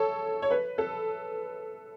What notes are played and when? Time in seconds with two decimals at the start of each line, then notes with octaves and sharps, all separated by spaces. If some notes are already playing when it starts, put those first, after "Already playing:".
Already playing: A4 C#5
0.42 C#5
0.51 B4
0.78 A4